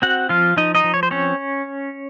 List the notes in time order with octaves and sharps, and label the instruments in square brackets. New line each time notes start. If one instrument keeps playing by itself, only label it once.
[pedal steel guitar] C4 F#4 F#5
F3 F4 F5
F3 D#4 D#5
D#4 D#5
F3
C#5
C5
C4 C#4 C#5